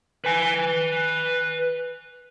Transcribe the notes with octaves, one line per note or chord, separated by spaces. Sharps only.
B4 G#5